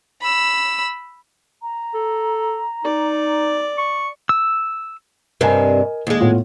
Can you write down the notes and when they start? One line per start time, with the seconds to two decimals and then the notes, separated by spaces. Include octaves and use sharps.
0.21 B5 E6
1.62 A#5
1.94 A4
2.85 D#4 D5
3.78 C#6
4.29 E6
5.41 G2 C3 A#4 D#5 G#5
6.07 D#2 G#3
6.20 A2 B3 F4